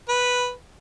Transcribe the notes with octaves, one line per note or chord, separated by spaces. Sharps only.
B4